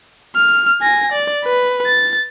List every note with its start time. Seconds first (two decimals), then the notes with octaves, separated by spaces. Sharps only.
0.36 F6
0.81 G#5 A#6
1.12 D5
1.44 B4
1.86 A6